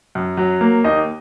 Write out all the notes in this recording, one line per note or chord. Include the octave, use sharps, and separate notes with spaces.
F#2
F#3
A#3
D#2 D#4 D#5